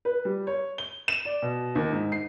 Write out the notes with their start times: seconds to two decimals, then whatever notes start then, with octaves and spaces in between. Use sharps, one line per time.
0.05 B4
0.25 G3
0.47 C#5
0.78 G7
1.08 E7
1.25 D5
1.42 B2
1.75 D#2
1.92 G#2
2.12 C7